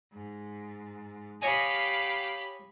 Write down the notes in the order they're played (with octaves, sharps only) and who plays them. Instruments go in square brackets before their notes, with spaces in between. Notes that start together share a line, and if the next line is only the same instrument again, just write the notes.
[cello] G#2
[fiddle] G4 B5 [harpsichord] C#5 D#5 G#5 [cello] F5 G5